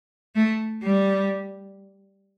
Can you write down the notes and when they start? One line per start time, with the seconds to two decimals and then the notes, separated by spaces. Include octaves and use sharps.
0.36 A3
0.83 G3